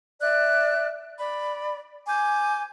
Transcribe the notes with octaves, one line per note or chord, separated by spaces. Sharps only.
D5 E5 F#6
D5 B5
G#5 D6 G6